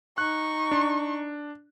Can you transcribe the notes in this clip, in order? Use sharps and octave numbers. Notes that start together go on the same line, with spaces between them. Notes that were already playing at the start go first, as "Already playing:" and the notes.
D#4 C#6 F#6
D4